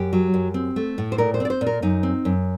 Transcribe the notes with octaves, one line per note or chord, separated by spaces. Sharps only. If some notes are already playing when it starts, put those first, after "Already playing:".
Already playing: F#2 G4
F#3
F#2
C4
A3
A2
C5
A#2 A#4
C5
C4 D5
C5
A#2
A#4
F#2 D#4
C4
F#2